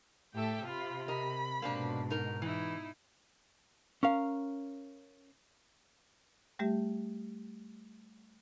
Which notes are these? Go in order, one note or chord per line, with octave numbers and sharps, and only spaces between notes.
A2 G4 A4 E5 G5
C3 F4 B5
A#4 D#5 B5
G#2 B2 A#3 C4 D4
D#4 A#4
E3 D#4 E4
C#4 A#4 F5
G3 A3 G4 E5